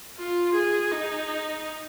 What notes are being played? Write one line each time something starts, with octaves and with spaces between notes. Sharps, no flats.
F4
G#4
D#4